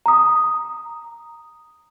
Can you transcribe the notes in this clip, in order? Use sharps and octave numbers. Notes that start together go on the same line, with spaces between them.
A#5 D#6